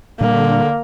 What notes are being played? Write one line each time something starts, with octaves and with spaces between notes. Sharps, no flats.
A#2 D3 G3 A#3